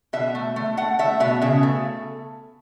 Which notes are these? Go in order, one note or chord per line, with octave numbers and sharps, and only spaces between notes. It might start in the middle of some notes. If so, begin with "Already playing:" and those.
B2 E5
A3
A3
A3 F#5
A3 E5
B2 E5
C#3 E5
A3